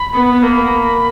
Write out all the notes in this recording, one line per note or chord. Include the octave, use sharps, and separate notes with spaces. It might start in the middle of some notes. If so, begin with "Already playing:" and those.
Already playing: B5
B3
A#3 B5